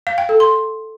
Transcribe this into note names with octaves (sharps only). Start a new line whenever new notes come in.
F5
G5
A4
C6